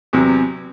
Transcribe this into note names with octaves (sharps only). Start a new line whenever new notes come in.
E2 C3 F#3 C4